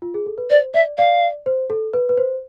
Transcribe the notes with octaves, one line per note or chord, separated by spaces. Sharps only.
F4
G#4
A4
B4
C5 D5
D5 E5
D5 F5
C5
A4
B4
B4
C5